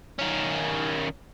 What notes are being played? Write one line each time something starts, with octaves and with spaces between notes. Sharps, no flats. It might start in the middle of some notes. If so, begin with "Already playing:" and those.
D#3 C#4